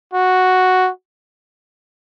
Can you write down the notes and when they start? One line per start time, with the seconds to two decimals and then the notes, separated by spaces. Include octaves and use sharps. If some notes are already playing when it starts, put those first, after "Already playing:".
0.13 F#4